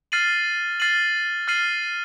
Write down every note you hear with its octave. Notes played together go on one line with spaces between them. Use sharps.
F6 A6 C7 D#7 F#7
F6 A6 C7 D#7 F#7
F6 A6 C7 D#7 F#7